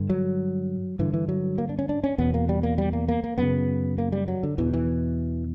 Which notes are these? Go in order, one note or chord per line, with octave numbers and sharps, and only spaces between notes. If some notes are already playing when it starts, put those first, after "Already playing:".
Already playing: G2 D3
F#3
G2 D3 E3
E3
F#3
A#3
D4
C#4
D4
C#4
E2 B2 B3
A#3
G3
A#3
G3
A#3
A#3
A#3
F#2 C#3 B3
A#3
G3
F#3
D3
E2 B2 E3
E3